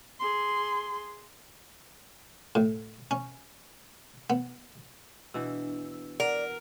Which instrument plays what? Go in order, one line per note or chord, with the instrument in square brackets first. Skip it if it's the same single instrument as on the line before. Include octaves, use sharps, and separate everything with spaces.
[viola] G#4 C6
[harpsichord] A2
C#4
B3
[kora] B2 E3 [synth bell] D4 E6
[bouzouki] A#4 [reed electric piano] D5 [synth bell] F#5